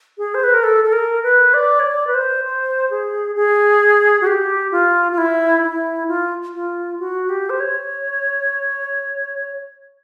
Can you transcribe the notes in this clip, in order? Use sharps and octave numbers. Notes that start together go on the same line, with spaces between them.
G#4
C5
B4
A#4
A4
A4
A#4
B4
D5
C#5
D5
B4
C5
C5
G#4
G#4
F#4
G4
F4
F4
E4
E4
F4
F4
F#4
G4
C5
C#5